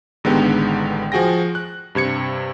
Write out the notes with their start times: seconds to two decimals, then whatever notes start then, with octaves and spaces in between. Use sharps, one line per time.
0.24 A1 D3 D#3 G#3 B3 G4
1.12 F3 F#4 G#4 G5 A#6
1.55 F#6
1.95 G2 C3 G#6 C#7